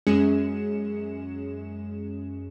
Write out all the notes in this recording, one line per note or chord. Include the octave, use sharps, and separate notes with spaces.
F#2 G#3 C#4 G#4 C#7 E7